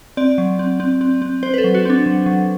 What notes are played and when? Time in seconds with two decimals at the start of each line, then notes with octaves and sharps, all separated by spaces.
0.17 C4 D5
0.38 F#3
0.59 C4
0.80 C4
1.01 C4
1.22 C4
1.43 C4 C5
1.54 B4
1.58 A4
1.64 F#3
1.74 F#4
1.85 C4 D4
2.06 F#3
2.26 F#3